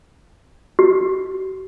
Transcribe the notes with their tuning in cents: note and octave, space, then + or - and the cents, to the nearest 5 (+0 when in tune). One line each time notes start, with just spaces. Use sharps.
F#4 +40